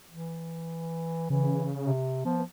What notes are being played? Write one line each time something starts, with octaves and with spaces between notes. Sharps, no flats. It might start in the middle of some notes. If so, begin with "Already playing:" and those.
E3
C#3 E3
C3
F3 B3